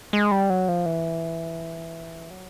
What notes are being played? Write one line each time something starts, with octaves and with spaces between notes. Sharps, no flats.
G#3
G3
F#3
F3
E3
F#3